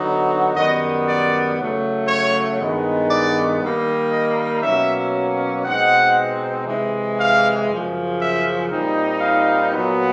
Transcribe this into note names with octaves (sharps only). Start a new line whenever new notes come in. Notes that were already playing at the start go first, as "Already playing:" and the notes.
Already playing: D3 F#3 B3 D#4
F#2 D#3 G3 B3 D#5
D5
C#3 F#3 A3
C#5
G2 D#3 G#3 B3 D#4
D5
D#3 G3 A#3 D#4
D#5
B2 F#3 A#3 C#4 E5
B2 G#3 C4 D#4 F#5
C3 E3 G#3
F5
F#2 C#3 F3
E5
A#2 G3 C4 D#4
F5
A#2 F#3 B3